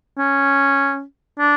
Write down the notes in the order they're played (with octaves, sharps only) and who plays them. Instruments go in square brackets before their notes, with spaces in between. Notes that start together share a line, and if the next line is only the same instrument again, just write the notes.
[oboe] C#4
D4